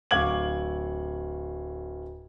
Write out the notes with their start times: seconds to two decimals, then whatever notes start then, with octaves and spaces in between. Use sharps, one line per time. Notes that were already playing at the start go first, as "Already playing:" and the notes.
0.11 D1 F5 C#6 D6 G#6 F#7